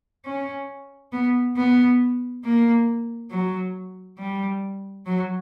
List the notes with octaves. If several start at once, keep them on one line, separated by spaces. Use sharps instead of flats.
C#4
B3
B3
A#3
F#3
G3
F#3